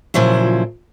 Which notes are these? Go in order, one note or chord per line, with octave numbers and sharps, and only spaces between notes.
A#2 C#3 F3 F#3 E4